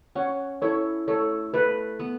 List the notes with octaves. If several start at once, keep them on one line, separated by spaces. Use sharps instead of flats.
C#4 C#5 F#5
E4 A4 C#5
A3 A4 C#5
A3 B4
B3